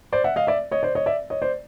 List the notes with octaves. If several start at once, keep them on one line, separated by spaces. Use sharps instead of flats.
C5 D5
E5 F#5
D#5 F5
D5 E5
C#5 D#5
C5 D5
C#5 D#5
D5 E5
C#5 D#5
C5 D5